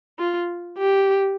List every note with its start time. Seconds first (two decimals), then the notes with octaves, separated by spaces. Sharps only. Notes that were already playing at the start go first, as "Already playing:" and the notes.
0.19 F4
0.78 G4